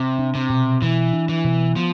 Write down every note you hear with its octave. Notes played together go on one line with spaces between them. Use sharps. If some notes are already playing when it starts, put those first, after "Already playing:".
Already playing: C3
D4
C3
B2
B2 E3
D4
E3
B2
F3 B3